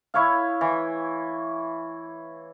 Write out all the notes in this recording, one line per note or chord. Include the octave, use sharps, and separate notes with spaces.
E4 C#5 F5
E3